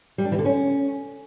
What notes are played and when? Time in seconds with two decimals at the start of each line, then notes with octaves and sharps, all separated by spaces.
0.18 G3
0.25 D4
0.32 E3
0.38 D3
0.45 C#4